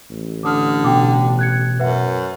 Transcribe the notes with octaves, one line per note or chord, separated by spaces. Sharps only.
A1
D3 D6 D#6 F6
B2 G5 D6
F#6 G#6 C#7
F#2 B4 E5 F#5